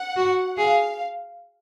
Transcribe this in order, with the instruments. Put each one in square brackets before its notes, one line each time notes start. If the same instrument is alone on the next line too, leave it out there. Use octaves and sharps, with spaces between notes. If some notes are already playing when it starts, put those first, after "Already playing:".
Already playing: [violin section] F#5
[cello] F#4
[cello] G#4 [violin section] F5